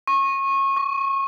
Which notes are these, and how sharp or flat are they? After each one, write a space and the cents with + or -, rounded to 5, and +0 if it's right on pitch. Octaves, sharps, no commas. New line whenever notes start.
C#6 -25
C#6 +25